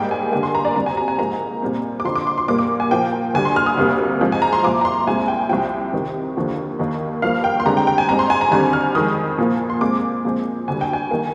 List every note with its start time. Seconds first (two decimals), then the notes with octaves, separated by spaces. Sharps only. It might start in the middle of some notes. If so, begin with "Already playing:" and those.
Already playing: G#2 G3 A#3 G5
0.11 G#5
0.32 G2 D3 G3 A#3 G#5
0.43 C6
0.55 A#5
0.65 D5
0.76 D2 C3 G3 A#5
0.86 G#5
0.97 A#5
1.08 G#5
1.18 G#2 F3 A#3 A#5
1.62 A#2 G3 C4
2.00 D6
2.05 F2 D3 F3 C6
2.15 D6
2.27 C6
2.38 C6
2.48 A#2 G3 A#3 D6
2.58 D6
2.80 G#5
2.91 A#2 F3 A#3 G5
3.34 D2 D3 G3 G#5
3.45 C6
3.56 F6
3.66 D#6
3.77 D2 C3 G3 A#3
4.21 G#2 F3 G#3 C4
4.32 G#5
4.42 A#5
4.53 C6
4.63 C2 A#2 F3 D6
4.81 A#5
4.85 C6
5.07 C2 A#2 G#3 C4 G#5
5.28 G5
5.49 C2 C3 F3 G5
5.93 C2 C3 D#3
6.37 D#2 D3 F3 A#3
6.79 D#2 D#3 A#3
7.22 G2 F3 A#3 F5
7.44 G5
7.60 C6
7.66 G2 D3 G#3 C4 A#5
7.77 G5
7.87 G5
7.98 G#5
8.09 G#2 G3 C4 A#5
8.19 C6
8.30 G#5
8.41 A#5
8.51 D#2 D3 G3 C4 G#5
8.73 F6
8.95 F2 D#3 G#3 D#6
9.38 A#2 F3 A#3
9.70 C6
9.81 A#2 G#3 C4 D6
10.24 A#2 F3 G#3 C4
10.68 D2 D3 G3 G#5
10.81 G5
10.93 G#5
11.11 D#3 G3 A#3